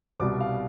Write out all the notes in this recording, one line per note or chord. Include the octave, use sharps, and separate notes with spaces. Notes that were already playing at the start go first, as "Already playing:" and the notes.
C2 B2 G3 D6
F5